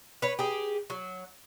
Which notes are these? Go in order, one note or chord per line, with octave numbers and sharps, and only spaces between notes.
B4 C#5
G4 G#4
F#3